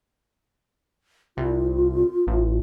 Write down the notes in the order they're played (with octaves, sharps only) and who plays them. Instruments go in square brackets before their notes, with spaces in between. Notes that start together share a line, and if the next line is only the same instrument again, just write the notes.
[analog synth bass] C2 [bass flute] F4
[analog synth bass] A1